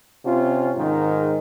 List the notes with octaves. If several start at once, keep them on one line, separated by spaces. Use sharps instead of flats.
C3 C#4 F4
G#2 D#3